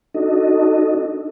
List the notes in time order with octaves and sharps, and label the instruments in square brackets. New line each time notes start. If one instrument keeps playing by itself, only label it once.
[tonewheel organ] D4 D#4 F#4 A4 D#5